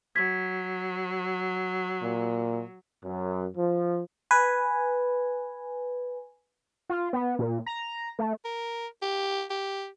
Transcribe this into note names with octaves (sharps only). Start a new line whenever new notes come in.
F#3 G#6 B6
A#2
F#2
F3
B4 G#5
F4
B3
A#2
A#5
A3
A#4
G4
G4